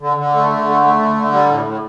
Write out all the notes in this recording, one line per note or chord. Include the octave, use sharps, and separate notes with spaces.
D3
D3
A3
D3
A3
A3
D3
D3
G3
A2
A2